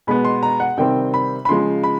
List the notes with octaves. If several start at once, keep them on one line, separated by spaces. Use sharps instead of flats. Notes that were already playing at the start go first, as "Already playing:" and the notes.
B2 G#3 B3 B5
C6
A#5
F#5
C3 D#3 G3 C4 G5
B5
B5
C#3 F3 G#3 C6
B5